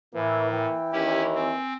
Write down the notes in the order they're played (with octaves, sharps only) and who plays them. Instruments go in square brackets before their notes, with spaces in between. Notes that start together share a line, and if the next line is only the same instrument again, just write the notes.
[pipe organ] A2 [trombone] E3 [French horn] A#3
[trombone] E3 [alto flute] G5
[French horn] D#2 [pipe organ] C#4 E4 G4
[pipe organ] C4 [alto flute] G#5